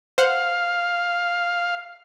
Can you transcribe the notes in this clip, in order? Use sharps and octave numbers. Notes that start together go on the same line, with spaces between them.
C5 F5 F#5